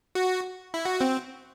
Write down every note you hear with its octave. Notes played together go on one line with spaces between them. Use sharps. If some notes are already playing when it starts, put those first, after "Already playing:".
F#4
E4
F#4
C4